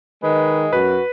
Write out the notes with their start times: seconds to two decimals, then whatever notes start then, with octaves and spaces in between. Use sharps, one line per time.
0.23 D#3 G#3 B4
0.73 F#2 F#4 B4